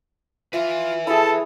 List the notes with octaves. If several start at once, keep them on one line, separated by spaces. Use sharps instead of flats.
F4 B4 E5
E4 G#4 A4 A5